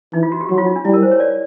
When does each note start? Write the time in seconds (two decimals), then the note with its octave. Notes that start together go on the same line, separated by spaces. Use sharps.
0.13 E3 D#4
0.23 F4
0.32 F#4
0.41 G4
0.49 F#3 F#4
0.58 F4
0.67 D#4
0.76 D4
0.85 G3 E4
0.93 A#4
1.03 C5
1.11 C#5
1.20 D5